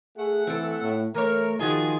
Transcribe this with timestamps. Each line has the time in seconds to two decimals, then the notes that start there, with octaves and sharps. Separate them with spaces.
0.18 A3 G#4 F#5
0.47 E3 C4 A4
0.82 A2
1.15 E3 A3 A#4 C#5
1.59 D#3 F3 F4 F#4 G#4